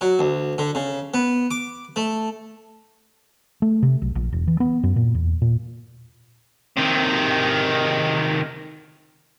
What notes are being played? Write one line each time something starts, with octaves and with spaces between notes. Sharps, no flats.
F#3
D2
D3
C#3
B3
D6
A3
A3
C3
B1
A#1
E1
E3
B3
F#2
A#2
E2
A#2
C3 D#3